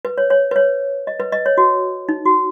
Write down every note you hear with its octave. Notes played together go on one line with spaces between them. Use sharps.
B4
C#5
C#5
B4
C#5
D#5
B4
D#5
C#5
F#4
D#4
F#4